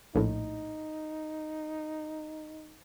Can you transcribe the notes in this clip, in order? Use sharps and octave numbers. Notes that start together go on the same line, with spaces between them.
A#1 A2 D#4